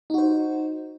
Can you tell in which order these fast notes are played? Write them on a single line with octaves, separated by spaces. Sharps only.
D#4 F#4 C5